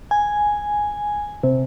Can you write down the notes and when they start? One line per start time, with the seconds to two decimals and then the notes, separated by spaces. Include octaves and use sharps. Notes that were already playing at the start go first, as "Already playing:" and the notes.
0.11 G#5
1.43 C3